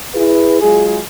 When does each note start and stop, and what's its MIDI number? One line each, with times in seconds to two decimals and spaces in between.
0.15 0.59 64
0.15 0.59 68
0.15 0.59 71
0.62 0.99 54
0.62 0.99 56
0.62 0.99 65
0.62 0.99 68